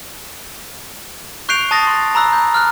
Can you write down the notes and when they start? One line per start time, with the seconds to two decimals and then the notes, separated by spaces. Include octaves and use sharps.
1.49 C#6 F#6 G6 C7 D7 F7
1.71 A5 D#6 A6 A#6
1.87 C6
2.15 A#5 B5 E6 F#6
2.33 G6
2.54 F6 F#6